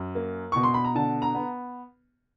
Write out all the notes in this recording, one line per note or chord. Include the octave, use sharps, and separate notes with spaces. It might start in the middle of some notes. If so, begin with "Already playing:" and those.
Already playing: F#2
A#3
B2 C#6
C6
B5
A#5
D3 A5
A#5
B3